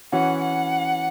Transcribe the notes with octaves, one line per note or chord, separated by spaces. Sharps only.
E3 C#4 F#4 F#5
F#5